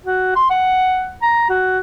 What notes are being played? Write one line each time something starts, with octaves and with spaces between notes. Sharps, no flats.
F#4
C6
F#5
A#5
F#4